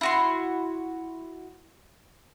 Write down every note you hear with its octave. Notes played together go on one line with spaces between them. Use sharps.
E4 F#4 C6